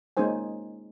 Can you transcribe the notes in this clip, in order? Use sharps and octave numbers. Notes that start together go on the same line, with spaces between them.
G#3 A#3 C#4 D#4 C5 G#5